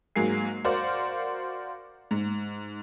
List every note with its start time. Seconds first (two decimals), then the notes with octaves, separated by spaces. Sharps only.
0.16 G#2 F#3 A#3 G#4 C7
0.64 F#4 A#4 C5 D5 F5
2.11 G#2